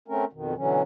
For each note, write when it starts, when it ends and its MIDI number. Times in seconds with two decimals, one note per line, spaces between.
0.08 0.25 57
0.08 0.25 60
0.08 0.25 61
0.08 0.25 70
0.33 0.54 41
0.33 0.54 47
0.33 0.54 51
0.56 0.82 47
0.56 0.82 50
0.56 0.82 52
0.56 0.82 54
0.56 0.82 61